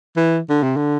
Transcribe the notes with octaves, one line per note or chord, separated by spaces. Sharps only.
E3
D3
C3
D3